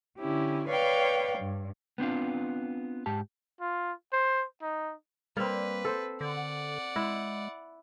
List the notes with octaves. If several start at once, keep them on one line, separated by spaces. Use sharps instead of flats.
D3 C#4 E4 G4
B4 C#5 D5 F5 G5
G2
B3 C4 D4 F4
G#2 G4 A5
F4
C5
D#4
G3 A#3 C4 B4
A4 C5
D3 D5 F#5
G#3 E4